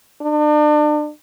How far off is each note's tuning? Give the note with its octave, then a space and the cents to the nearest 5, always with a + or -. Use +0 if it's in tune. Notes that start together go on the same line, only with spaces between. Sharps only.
D4 +35